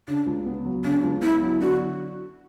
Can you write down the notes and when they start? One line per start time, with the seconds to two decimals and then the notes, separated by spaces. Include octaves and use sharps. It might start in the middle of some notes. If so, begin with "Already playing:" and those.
0.08 C#3 D4
0.26 C#2
0.46 B3
0.65 F#3
0.84 C#3 D4
1.03 C#2
1.22 B3 E4
1.42 F#3
1.61 D3 F#4